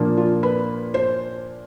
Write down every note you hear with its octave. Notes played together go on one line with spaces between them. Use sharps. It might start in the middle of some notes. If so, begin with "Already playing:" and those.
Already playing: A#2 F3 A#3 D4
F4
B4
C5